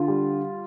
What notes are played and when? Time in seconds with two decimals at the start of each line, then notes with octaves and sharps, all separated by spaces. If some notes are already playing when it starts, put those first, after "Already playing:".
Already playing: D3 F4
0.08 G3